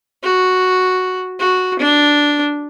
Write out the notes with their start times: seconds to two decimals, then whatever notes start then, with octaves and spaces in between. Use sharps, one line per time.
0.23 F#4
1.39 F#4
1.79 D4